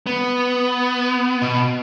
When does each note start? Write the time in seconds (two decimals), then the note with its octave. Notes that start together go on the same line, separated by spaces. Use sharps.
0.07 B3
1.42 B2